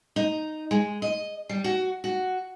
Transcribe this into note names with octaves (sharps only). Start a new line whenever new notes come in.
D#4
G#3
D#5
G3
F#4
F#4